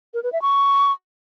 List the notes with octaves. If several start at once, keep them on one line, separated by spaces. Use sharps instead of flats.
A#4
B4
E5
C#6